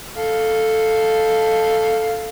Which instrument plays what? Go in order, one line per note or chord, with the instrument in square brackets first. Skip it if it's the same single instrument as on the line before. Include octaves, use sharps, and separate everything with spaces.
[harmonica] A4 F5